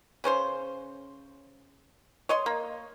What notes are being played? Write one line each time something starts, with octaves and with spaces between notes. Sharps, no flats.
C#3 C#4 C5 C6
C#5 D#5 C6
A#3